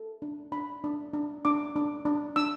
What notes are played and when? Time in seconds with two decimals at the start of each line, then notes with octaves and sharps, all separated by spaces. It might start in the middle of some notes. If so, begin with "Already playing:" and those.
Already playing: A4
0.22 D4
0.52 D4 B5
0.84 D4
1.13 D4
1.45 D4 D6
1.76 D4
2.05 D4
2.36 D4 E6